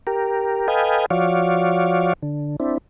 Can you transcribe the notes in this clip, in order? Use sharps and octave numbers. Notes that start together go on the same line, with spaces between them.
G4 A#4
A4 B4 D#5 F5 G5 G#5
F3 F#4 C#5 D5 F5
D3
C4 D4 E4